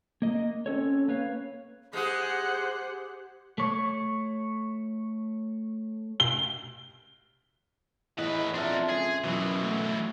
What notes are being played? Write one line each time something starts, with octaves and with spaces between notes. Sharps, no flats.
A#3 D#5
C4 C#4 A4 C#5
A#3 B4 C#5 F5
G#3 G4 G#4 C5 F#5
A3 C#5
G7
E2 A2 E3 B4 D#5
F2 D4 A#4 E5 C6
C#2 G#4
F#2 B2 E3 F#3
A3